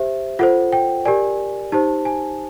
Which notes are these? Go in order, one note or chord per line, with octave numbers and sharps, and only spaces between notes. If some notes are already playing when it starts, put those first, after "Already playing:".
Already playing: G4 C5 E5
F4 A4 C5 F#5
G5
G4 A#4 D5 G#5
D#4 G4 C5 A5
G#5